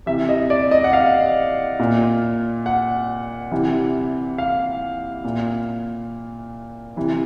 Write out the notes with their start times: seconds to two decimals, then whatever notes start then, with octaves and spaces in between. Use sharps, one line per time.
0.06 C3 E3 E5
0.29 D#5
0.50 D5
0.71 D#5
0.84 F#5
0.93 F5
1.80 A#2
2.66 F#5
3.51 C3 E3
4.38 F5
5.24 A#2
6.96 C3 E3